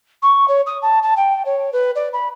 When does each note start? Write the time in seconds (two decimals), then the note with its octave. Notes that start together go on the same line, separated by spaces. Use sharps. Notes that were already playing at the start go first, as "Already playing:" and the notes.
0.22 C#6
0.48 C#5
0.66 D#6
0.82 A5
1.03 A5
1.16 G5
1.45 C#5
1.72 B4
1.95 D5
2.13 B5